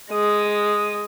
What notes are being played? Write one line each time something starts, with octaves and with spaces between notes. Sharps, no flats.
G#3 D#6